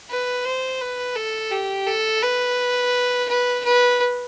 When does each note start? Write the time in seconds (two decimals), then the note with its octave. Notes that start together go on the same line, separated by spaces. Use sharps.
0.10 B4
0.45 C5
0.81 B4
1.16 A4
1.51 G4
1.87 A4
2.22 B4
3.29 B4
3.65 B4